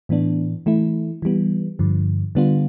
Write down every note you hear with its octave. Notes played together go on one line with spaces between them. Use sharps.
A2 E3 B3 D4
E3 A3 E4
E3 G3 B3
G2 D3 F3
D3 G3 B3 D4 F4